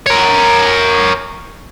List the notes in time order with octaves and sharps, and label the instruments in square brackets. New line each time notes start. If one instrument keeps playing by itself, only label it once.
[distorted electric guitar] A#4 C#5